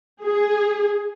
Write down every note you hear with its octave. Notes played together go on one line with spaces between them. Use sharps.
G#4